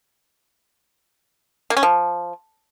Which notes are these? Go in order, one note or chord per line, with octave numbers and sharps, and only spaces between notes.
A#3
C#4
F3